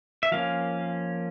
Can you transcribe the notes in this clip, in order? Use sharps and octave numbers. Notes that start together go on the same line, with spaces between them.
E5
F3 A#3 C#4 F5